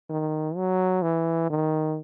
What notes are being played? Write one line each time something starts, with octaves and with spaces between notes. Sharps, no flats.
D#3
F#3
E3
D#3